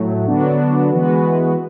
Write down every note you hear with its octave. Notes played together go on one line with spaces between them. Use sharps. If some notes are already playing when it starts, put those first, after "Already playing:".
Already playing: A2 F#3 A3
D3 F#3 B3 D4 F#4
E3 G#3 B3 F#4 B4